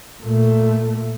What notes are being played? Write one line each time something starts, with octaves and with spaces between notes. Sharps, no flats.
A#2 A3